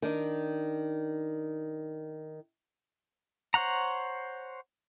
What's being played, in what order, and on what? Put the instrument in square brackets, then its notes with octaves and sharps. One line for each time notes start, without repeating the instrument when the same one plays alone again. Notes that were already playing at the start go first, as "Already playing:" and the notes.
[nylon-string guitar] D#3 D4
[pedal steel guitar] C5 C#5 F#5 A#5